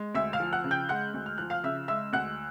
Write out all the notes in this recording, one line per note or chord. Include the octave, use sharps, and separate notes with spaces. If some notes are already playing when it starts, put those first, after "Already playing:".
Already playing: G#3
D2 E5 E6
F5 F6
F3
F#5 F#6
C#3
G5 G6
G#3 F#5 F#6
D2
F6
F3 F#6
F5 F6
C#3 E5 E6
G#3 E5 E6
D2 F#5 F#6